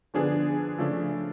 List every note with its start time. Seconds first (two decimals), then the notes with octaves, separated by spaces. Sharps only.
0.14 D3 F3 B3 D4 G#4
0.78 C#3 F3 A3 D4